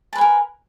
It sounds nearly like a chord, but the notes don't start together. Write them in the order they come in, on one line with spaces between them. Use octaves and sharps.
A5 B4 G#5 A#4